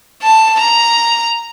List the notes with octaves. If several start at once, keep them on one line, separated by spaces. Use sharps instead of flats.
A5
A#5